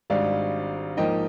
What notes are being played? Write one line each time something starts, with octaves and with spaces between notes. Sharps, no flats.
G#1 G#2 G3 D4 D5 F5
G#2 F3 A#3 D#4 D#5 G5